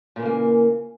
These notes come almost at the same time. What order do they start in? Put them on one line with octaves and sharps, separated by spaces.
A#2 E3 C#3 A#3